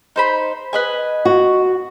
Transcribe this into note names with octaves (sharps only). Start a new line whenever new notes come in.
D#4 C5 B5
B4 D#5 G#5
F#4